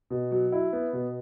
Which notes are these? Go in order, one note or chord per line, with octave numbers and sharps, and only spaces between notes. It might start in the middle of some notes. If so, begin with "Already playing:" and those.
B2
F#3
E4
B3
B2